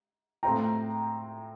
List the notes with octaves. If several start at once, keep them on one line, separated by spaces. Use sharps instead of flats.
A2 A3 C4 F4 G5 A#5